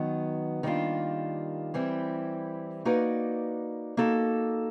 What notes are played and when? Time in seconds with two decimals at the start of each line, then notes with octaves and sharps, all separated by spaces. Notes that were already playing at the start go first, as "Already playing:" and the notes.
Already playing: D#3 F#3 B3
0.63 D#3 G3 A#3 D4 F4
1.74 E3 G3 C4 E4
2.85 A#3 D#4 F#4 B4 D5
3.97 A#3 D#4 F#4 A4